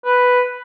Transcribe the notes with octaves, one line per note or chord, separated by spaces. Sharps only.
B4